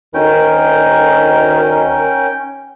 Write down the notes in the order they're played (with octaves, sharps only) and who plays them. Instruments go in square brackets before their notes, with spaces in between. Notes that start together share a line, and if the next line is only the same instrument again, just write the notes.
[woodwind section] D2 D#3 [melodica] C#4 G5 [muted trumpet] A#4